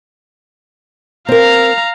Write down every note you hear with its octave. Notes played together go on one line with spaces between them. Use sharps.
C4 A#4 F5 A#5